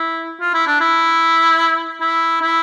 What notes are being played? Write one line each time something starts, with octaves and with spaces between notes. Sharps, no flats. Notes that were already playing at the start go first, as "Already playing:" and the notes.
Already playing: E4
F4
E4
D4
E4
E4
E4